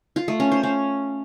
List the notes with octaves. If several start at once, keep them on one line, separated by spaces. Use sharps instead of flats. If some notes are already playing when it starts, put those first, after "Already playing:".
F4
A3
C#4
C5
C#4